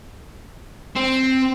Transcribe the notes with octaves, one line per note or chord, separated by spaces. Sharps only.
C4